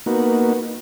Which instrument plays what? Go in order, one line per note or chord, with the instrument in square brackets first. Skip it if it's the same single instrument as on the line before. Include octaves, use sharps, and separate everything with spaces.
[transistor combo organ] A#3 B3 D#4 F#4